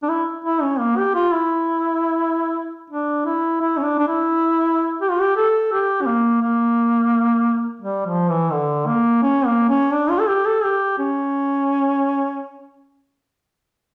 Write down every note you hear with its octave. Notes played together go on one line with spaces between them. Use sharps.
D4
E4
E4
C#4
A#3
G4
F4
E4
D4
E4
E4
C#4
D4
D4
E4
G4
F4
G4
A4
G4
C#4
A#3
A#3
G3
F3
E3
D3
A#3
C#4
A#3
C#4
D4
F4
A4
G4
A4
G4
C#4